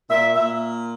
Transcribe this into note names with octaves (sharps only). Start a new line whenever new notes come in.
A#2 E5
A#2 E5